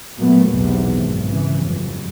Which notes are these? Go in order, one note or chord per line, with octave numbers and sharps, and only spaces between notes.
A#2 F#3 A3 B3
B1 E2 C3 B3
G#1 F#2
C#3 E3
F#1 C2 F2